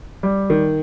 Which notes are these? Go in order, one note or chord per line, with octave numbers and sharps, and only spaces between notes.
G3
D#3